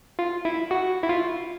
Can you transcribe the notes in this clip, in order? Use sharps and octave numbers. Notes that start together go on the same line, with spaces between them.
F4
E4
F#4
E4
F4